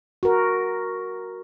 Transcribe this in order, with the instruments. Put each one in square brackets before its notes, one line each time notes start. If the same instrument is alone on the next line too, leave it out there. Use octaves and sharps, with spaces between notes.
[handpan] F#4 A#4